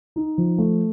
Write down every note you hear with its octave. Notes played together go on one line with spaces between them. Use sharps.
D#4
F3
A3